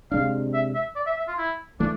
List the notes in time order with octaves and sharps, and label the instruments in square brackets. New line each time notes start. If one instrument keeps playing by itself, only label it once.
[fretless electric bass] C3 G#3 D4 [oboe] F5
[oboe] E5
E5
D5
E5
E5
F4
E4
[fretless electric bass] E3 A3 [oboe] D4